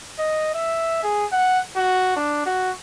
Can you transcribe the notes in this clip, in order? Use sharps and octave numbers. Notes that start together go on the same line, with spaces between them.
D#5
E5
G#4
F#5
F#4
D4
F#4